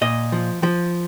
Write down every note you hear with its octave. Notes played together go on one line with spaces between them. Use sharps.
A#2 D#5
F3
F3